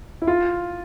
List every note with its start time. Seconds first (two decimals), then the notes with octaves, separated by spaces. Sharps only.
0.22 E4
0.27 F4